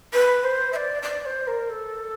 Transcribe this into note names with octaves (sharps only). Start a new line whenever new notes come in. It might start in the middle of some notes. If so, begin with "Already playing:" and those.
B4
C5
E5
D5
D5
C5
A#4
A4